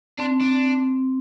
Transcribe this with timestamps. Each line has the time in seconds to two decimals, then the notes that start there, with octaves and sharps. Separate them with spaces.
0.19 C4 D4
0.41 D4